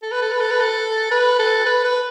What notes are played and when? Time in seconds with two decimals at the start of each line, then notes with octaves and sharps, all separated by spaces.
0.02 A4
0.12 B4
0.22 A4
0.32 B4
0.40 A4
0.51 B4
0.60 A4
1.11 B4
1.39 A4
1.66 B4
1.84 B4